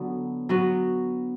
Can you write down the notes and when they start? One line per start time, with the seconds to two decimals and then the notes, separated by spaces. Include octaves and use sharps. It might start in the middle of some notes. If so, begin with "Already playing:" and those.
Already playing: D3 F#3 B3
0.49 F#3 B3 F#4